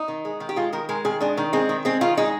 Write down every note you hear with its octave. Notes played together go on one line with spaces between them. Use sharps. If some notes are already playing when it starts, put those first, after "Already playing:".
Already playing: D#4
D#3
G#3
D#3
G4
G#3 F4
D#3 A#4
G#3 A#4
D#3 G#4
G#3 D4
D#3
G#3 C4
D#3
G#3 C4
D#3 F4
G#3 D#4